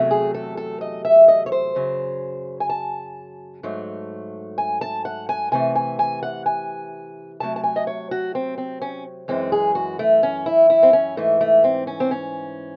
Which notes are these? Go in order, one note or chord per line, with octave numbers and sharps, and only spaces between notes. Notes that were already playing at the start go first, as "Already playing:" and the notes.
Already playing: E2 C3 F#3 A3
G#4
A4
A4
D#5
E5
D#5
C#5
C5
F#2 C#3 F#3
G#5
A5
G#2 F#3 A3
G#5
A5
F#5
G#5
C3 E3 A3 G#5
G#5
G#5
F#5
G#5
C3 F#3 A3 A5
A5
G#5
D#5
C#5
F#4
C4
C4
C#4
F#2 E3 G#3 C4
G#4
F#4
A3
C#4
E4
E4
C4
C#4
G#2 E3 A3
A3
C4
C#4
C4
C#4